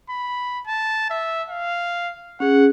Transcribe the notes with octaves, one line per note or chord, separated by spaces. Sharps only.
B5
A5
E5
F5
C#4 G#4 F#5